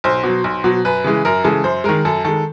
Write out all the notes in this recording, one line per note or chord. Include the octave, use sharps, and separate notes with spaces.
B1 C5
B2 F#3
B1
B2 F#3
F#2 B4
C#3 E3 G#3
F#2 A#4
C#3 E3 G#3 A4
F#2 C5
D#3 G#3 A#4
F#2 A4
D#3 G#3 A4